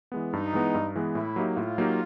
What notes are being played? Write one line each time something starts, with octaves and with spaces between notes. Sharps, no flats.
E3 G#3 B3
G2 D#4
E3 G#3 B3
G2
E3 G#3 B3
A2 E4
F#3 A#3 D#4 G4
A2 F4
F#3 A#3 D#4 G4